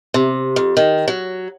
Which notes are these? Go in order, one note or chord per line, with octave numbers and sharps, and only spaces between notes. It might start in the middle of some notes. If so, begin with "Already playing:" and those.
C3
F2
D#3
F#3